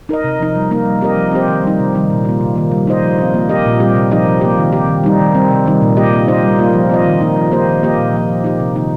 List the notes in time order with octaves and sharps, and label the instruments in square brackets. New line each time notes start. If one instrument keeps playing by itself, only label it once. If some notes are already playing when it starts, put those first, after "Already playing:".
[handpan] D#4 A#4 D#5
C3
F3 D#4
G3
A#3 D#4 A#4
G3
C4 G4 A#4 D#5
F3
C4 G4 C5
D#3
G3 D#4
C3
D#3 G3 D#4
A#2
A#3 F4
C3
D#3 A#3
G3
D#4 G4 C5 D#5
F3
C4 F4
A#3
G4 A#4 D#5
A#2
G3 C4 G4
C3
F3 D#4 G4 D#5
F3
A#3 G4
D#3
C4 G4
D#3
G3 D#4
D#3
G3 C4
C3
D#3 G3 D#4
A#2
A#3 G4 D#5
A#3
D#4 C5 D#5
G3
A#3 F4
F3
C4 F4 D#5
D#3
A#3 D#4
F3
A#3 G4 C5 D#5
D#3
A#3 G4 D#5
A#2
F3 A#3
F3
D#4 G4
C3
D#3 A#3 D#4